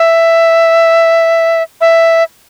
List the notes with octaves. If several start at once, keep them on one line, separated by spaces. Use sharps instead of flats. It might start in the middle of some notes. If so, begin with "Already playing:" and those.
Already playing: E5
E5